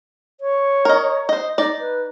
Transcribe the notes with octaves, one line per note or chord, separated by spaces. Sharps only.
C#5
A#4 D#5
C5 D#5
D#4 D5
B4